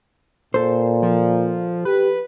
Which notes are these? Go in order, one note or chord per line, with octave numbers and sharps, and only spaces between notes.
A#2 A4 C5
F3
G4 B4